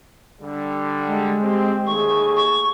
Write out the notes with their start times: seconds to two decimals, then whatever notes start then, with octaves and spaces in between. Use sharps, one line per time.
0.42 D3 G3
1.07 G#3
1.42 C4 G4
1.87 D#2 A3 G#4 C#6
2.36 C#6